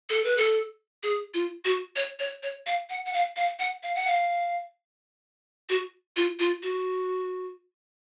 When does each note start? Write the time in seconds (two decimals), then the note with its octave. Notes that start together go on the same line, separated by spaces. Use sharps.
0.10 A4
0.24 B4
0.37 A4
1.03 G#4
1.34 F4
1.65 F#4
1.96 C#5
2.19 C#5
2.43 C#5
2.66 F5
2.90 F#5
3.06 F#5
3.13 F5
3.36 F5
3.59 F#5
3.83 F5
3.95 F#5
4.07 F5
5.69 F#4
6.16 F4
6.39 F4
6.63 F#4